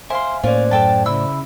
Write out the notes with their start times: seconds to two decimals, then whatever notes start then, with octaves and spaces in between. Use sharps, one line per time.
0.10 C5 E5 F5 G#5 C6
0.44 A2 A#3 C#4 F4 C5 D5
0.71 F#2 A4 G5 A5
1.06 C#3 E4 E6